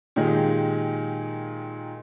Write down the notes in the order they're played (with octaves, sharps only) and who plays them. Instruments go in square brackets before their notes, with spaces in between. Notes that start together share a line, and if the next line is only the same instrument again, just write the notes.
[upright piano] A#2 D#3 G#3 D#4 G4 G#4